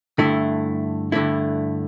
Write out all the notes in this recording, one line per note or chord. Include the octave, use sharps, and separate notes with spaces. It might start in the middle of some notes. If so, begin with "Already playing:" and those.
G2 D3 A3 E4
G2 D3 A3 E4